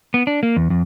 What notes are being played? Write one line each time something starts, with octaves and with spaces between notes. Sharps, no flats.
B3
D4
A#3
E2
F2